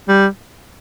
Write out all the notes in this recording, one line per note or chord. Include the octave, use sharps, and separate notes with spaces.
G3